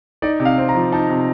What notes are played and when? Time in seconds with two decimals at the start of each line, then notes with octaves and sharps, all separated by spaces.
0.22 D#4 D5
0.40 C3
0.45 F5
0.58 C4
0.69 A#5
0.75 F3
0.92 D#4 A5
1.10 C3